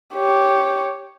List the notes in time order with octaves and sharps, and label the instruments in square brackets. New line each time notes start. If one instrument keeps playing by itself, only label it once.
[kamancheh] G4 C#5